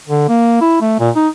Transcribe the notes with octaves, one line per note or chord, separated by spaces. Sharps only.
D3
A#3
E4
A3
A#2
D#4